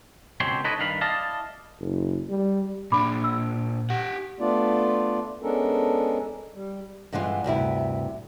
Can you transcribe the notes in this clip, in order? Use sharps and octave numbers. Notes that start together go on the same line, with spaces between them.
C#2 B2 C4 G4 C#5 C6
D#4 E4 A4 B4 C#5 D#5
G2 D#3 D4 F5 B5
E4 D5 D#5 F5 A5
F#1
G3
A#2 D4 B5 D6
E6
G4 F#5
A3 B3 D4 F4 D5
G#3 B3 C#4 D4 A4 A#4
G3
G2 D3 E3 G#3 F4
D2 G2 C3 E4